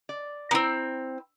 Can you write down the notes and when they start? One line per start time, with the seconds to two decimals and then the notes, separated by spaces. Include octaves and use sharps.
0.09 D5
0.51 B3 C4 E4 G5 A#5